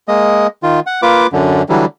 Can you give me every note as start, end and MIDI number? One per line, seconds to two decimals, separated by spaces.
0.08 0.47 56
0.08 0.47 58
0.08 0.47 75
0.63 0.80 51
0.63 0.80 65
0.86 1.01 78
1.02 1.27 58
1.02 1.27 65
1.02 1.27 71
1.02 1.27 86
1.32 1.62 42
1.32 1.62 50
1.69 1.86 50
1.69 1.86 52
1.69 1.86 54
1.69 1.86 55